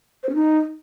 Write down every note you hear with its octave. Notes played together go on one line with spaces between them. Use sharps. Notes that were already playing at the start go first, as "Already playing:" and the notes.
C5
C#4
D#4